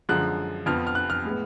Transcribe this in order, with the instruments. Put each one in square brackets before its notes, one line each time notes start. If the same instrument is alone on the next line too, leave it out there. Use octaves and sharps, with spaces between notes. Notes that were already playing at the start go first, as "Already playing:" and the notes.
[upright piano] F#2 D3 F3 G#3 F#6
F2 F3 B3 F6
F6
F#6
F6
A2 G#3 B3